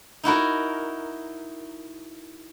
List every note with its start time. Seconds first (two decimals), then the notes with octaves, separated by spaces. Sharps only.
0.24 D#4 E4 F#4 A#4